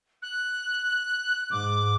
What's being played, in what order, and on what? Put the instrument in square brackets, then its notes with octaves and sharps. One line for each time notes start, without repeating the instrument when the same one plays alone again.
[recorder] F#6
[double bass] G#2 [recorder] D6